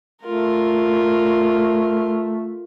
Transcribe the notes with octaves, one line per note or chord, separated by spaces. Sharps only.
A3 F4 A#4